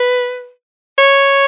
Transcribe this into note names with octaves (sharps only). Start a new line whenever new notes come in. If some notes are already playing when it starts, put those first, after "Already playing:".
Already playing: B4
C#5